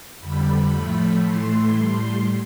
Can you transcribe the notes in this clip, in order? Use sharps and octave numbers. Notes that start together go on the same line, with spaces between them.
F2 D3 G3 B5
A2 F3 A3
A2 E3 A3 C6
A2 G3